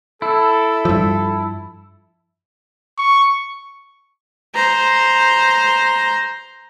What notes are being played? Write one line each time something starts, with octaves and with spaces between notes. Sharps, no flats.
E4 A4
G2 F3
C#6
C5 A#5